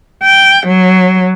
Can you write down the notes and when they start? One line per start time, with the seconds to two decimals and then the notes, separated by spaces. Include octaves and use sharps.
0.23 G5
0.68 F#3